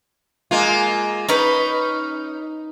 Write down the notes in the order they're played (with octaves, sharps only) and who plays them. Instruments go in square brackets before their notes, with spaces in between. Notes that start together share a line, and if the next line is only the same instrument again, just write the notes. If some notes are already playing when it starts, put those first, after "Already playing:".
[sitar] G#3 A#3 F4
[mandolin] C#4 B4 [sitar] D#4